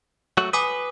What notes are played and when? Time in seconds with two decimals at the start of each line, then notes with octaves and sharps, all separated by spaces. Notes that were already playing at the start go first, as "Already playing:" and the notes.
0.37 F#3 A3 F#4
0.53 B4 G#5 D6 D#6